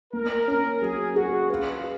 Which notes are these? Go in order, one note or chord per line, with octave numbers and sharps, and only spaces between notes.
A#3 A#4
C#4
F#3 G#4
F#4 G#4
F4 B4